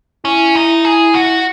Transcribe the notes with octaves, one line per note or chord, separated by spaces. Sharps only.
C#4 E4
D#4
G#4
F#4